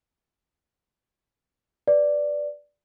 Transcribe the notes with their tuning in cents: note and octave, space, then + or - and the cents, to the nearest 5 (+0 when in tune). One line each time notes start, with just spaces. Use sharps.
B4 +0 D5 +0